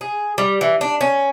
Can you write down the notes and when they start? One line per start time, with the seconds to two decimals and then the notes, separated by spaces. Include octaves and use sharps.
0.01 G#4
0.38 G3
0.61 E3
0.81 D4
1.01 C#4